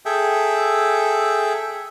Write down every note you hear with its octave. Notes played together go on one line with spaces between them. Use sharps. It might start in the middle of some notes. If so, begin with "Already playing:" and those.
G#4 A4 E5 G5